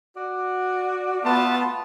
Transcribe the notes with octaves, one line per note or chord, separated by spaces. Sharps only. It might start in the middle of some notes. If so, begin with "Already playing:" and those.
F#4 D5
A3 B3 F4 A5